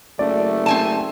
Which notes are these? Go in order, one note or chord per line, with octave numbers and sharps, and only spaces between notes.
F#1 A3 D5
C4 G#5 A5